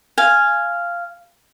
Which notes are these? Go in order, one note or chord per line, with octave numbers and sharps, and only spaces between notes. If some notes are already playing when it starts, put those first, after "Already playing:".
F5 G#5